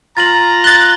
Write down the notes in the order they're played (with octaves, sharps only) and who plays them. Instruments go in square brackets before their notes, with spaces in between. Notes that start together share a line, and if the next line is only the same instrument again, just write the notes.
[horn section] F4 A#5 [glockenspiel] A6 F#7
[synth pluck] F#6 A6 [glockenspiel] G7